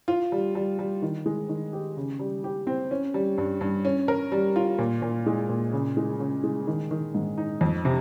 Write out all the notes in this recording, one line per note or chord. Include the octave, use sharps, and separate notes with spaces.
F4
G3
G3
G3
D#3
G#3
D#3
G4
C#3
G3
G4
C4
C#4
G3
G2
G2
C#4
A#4
G3
F4
A#2
A#2
G#3
A#2
C#3
G#3
C#3
G#3
D#3
D#3
G#2
D#4
F2
C3